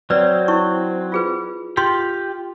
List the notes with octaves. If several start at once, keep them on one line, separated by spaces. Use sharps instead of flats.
F#3 C4 B4 D5
E4 C#6
F4 G#4 B4
F4 G4 G5 C6